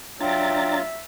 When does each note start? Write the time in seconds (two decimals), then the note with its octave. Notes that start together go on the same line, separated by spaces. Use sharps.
0.21 F#3 D4 F4 E5 G5 A#5 A6